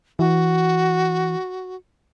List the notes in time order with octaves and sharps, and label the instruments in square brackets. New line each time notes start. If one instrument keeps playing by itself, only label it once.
[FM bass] E3 [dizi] F#4